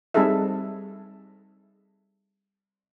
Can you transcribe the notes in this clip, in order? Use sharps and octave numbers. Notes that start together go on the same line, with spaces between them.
G3 C4 D#4 G#4 A4 E5